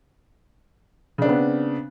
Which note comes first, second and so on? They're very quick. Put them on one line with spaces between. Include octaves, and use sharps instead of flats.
C#3 D4 C4 B3